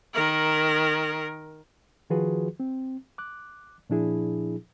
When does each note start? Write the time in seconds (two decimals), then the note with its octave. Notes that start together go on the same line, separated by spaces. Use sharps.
0.14 D#3 A#4
2.10 D#3 F3 F4 F#4 G#4 B4
2.60 C4
3.18 D6 F#6
3.90 A#2 F3 D4 E4 G#4